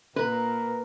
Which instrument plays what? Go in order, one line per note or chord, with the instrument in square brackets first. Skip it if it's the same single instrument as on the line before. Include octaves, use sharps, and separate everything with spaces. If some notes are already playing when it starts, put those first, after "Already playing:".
[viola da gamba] A#2 [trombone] A#4 [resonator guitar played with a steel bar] B4